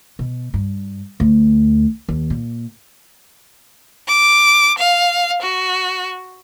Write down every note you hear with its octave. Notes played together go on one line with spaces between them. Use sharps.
B2
G2
D2
D#2
A#2
D6
F5
F#4